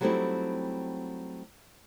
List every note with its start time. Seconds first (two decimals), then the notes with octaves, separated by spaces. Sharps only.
0.01 F#3 G3 A3 C4 D#4 E4